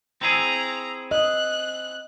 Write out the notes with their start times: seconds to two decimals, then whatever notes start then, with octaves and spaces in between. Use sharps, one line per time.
0.21 C4 E4 G#4 A#5
1.11 D#5 F#6